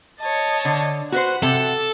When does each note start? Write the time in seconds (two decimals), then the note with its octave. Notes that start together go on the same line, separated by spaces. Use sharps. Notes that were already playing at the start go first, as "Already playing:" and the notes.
0.20 C#5 D#5 A5
0.65 D3
1.12 F#4 B4 C5 F#5
1.43 C3 A4